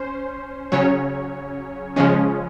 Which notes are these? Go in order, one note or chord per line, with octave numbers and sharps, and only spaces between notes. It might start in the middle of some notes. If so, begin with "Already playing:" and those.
Already playing: C#4 C5
C#3 F#3 C#4 C#5
C#3 F3 G#3 C#4